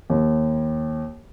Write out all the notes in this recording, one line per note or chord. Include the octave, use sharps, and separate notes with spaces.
D#2